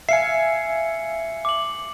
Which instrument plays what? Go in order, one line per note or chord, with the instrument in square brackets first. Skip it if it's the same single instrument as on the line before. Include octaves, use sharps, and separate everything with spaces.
[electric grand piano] E5 F5 G#5 [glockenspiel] C7 C#7
[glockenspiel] D6 F#7